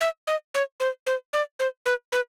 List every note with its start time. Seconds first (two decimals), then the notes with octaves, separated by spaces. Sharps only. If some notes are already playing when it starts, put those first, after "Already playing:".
0.01 E5
0.27 D#5
0.54 C#5
0.80 C5
1.07 C5
1.33 D5
1.59 C5
1.86 B4
2.12 B4